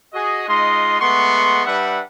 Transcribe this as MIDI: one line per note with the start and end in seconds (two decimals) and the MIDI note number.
0.13 0.46 66
0.13 0.46 68
0.13 0.46 75
0.47 0.96 56
0.47 0.96 63
0.47 0.96 65
0.47 0.96 75
0.47 0.96 84
1.00 1.62 56
1.00 1.62 57
1.00 1.62 59
1.00 1.62 78
1.00 1.62 84
1.00 1.62 85
1.65 1.99 55
1.65 1.99 62
1.65 1.99 71
1.65 1.99 76
1.65 1.99 78